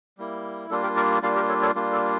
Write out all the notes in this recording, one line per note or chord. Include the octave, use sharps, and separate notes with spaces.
G3 A#3 E4
G3 A#3 D4 F4 A4
G4 A#4
A#4 D5
G3 A#3 D4 F4 D5 F5
G4 A#4
A4 C#5
A4 C#5
G3 A#3 D4 F4
A4